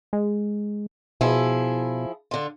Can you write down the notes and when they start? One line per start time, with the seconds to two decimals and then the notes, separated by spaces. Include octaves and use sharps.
0.13 G#3
1.21 B2 F3 E4 G#4
2.31 D3 F4